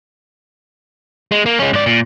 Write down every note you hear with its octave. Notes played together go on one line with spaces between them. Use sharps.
G#3
A#3
G#3 C#4
G#2 D5
A#2